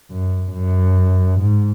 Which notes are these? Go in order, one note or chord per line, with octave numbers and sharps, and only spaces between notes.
F#2
F#2
G#2